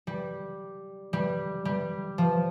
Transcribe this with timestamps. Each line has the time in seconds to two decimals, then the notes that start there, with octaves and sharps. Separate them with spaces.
0.07 G3
1.13 G3
1.65 G3
2.18 F3